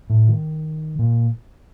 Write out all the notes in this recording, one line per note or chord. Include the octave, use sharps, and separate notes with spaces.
A2
D#3
A#2